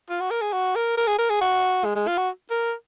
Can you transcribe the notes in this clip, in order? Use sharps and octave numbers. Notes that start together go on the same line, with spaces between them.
F4
F#4
A#4
G#4
F#4
A#4
A#4
G#4
A#4
G#4
F#4
G#3
G#3
F4
F#4
A#4